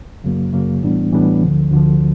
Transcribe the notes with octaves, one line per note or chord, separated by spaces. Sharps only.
F#2 C#3 F#3 A#3
F#2 C#3 F#3 A#3
A2 E3 G3 B3 D4
A2 E3 G3 B3 D4
D2 D3 F3
D2 D3 F3